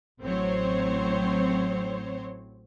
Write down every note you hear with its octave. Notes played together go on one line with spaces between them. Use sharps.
A1 A2 F#3 C4 C5 C#5